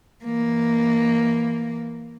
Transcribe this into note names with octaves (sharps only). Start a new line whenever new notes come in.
E3 A#3